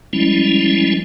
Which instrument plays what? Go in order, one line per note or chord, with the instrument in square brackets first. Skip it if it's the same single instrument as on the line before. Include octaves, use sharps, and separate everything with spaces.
[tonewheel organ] F3 G3 G#3 C#4 E4